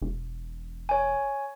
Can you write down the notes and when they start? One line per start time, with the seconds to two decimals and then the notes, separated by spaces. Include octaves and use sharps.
0.01 E1
0.89 C#5 G#5